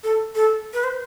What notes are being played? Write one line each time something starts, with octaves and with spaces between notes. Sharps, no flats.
A4
A4
B4
C5